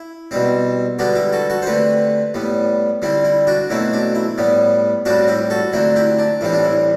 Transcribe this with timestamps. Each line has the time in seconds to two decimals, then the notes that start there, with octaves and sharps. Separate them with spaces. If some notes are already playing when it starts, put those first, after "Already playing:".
Already playing: E4
0.31 B2 G3 C4
0.99 D3 G3 B3 D4 F#4
1.15 E4 G4
1.33 F#4 A4
1.50 F#4 A4
1.62 C5
1.66 D3 A3 C4 G4 B4
2.34 A2 G3 B3
3.02 D3 G3 C4 E4
3.24 E4
3.47 D4 F#4
3.70 B2 F#3 A3 C4 E4
3.93 D4
4.15 E4
4.38 A2 G3 B3
5.05 A2 G3 C4 D4 F#4
5.28 E4 G4
5.50 F#4 A4
5.73 D3 F#3 A3 C4 E4
5.96 E4 G4
6.19 D4
6.41 A2 E3 G3 C4 E4
6.53 D4
6.63 E4